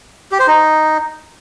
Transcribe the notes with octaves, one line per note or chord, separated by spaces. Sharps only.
G4
C5
D#4